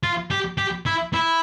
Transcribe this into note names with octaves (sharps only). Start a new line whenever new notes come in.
F4
G4
G4
E4
E4